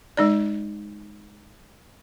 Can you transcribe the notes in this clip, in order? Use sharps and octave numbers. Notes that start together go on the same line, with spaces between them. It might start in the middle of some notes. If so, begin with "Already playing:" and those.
G#3 D#4 D5